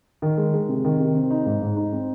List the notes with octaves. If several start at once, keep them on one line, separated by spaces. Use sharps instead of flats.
D#3
G#3
G#3
C3
D#3
C3
C4
D#4
G#2
G#2
D#4
C4